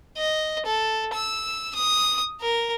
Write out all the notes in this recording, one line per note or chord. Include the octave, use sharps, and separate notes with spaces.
D#5
A4
E6
D#6
A#4